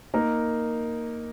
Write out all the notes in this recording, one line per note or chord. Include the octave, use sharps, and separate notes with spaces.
A#3 D#4 A#4